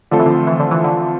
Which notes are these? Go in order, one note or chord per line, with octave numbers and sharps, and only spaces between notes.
D3 F3 A3 C4 F4 A4
E3
D3
E3
D3
E3
D3